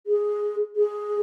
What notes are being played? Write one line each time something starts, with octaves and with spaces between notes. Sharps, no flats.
G#4
G#4